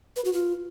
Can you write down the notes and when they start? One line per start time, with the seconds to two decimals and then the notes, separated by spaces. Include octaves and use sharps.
0.16 B4
0.25 F#4
0.33 F4